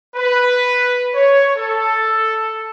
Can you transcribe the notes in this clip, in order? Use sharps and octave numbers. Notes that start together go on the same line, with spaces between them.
B4
C#5
A4